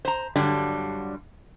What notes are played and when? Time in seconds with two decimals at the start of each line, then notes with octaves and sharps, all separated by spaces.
0.05 C5 A#5
0.36 G2 D3 F#3 G3 D4